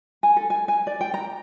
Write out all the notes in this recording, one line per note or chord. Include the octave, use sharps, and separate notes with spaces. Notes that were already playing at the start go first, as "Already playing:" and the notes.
G#5
A4
G#5
G#5
D5
G5
A#5